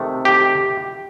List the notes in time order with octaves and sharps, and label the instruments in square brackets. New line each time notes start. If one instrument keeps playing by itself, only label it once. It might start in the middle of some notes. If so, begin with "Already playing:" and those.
Already playing: [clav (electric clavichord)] C3 D#3 A3
G4